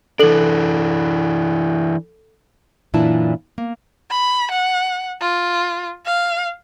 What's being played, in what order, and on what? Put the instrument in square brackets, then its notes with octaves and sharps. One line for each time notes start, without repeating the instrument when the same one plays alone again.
[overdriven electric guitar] E3 D4 [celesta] A4 F#7
[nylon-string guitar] F#2 A#2 E3 D4 E4 A5
A#3
[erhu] B5
F#5
F4
F5